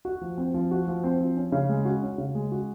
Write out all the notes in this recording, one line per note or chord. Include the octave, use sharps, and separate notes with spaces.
F#4
F3
C4
F3
F#4
F3
C4
F3
C#4
C#3
G#3
F#4
C#4
C#3
G#3
F#4